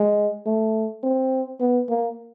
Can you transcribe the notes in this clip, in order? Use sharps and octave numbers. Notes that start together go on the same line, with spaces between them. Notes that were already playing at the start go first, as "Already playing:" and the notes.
Already playing: G#3
A3
C4
B3
A#3